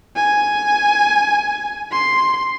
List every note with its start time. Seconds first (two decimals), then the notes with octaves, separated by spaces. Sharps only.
0.16 G#5
1.92 C6